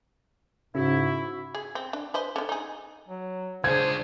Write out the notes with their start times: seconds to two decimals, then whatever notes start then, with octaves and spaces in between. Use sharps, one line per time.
0.75 G#2 C#3 E4 F#4
1.55 G#4
1.75 C4
1.93 D4
2.14 B4 C5 D#5
2.36 D3 D#3
2.49 D#4 G#4
3.08 F#3
3.64 C#2 D4 G#4 C5 G#6